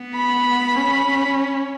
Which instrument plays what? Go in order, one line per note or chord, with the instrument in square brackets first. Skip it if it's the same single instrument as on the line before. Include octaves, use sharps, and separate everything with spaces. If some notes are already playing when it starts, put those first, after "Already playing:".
Already playing: [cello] B3
[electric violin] B5
[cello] C#4